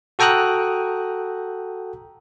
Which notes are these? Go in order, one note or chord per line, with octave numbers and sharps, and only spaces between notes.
F#4 A4 G5 A#5 D#6 F#6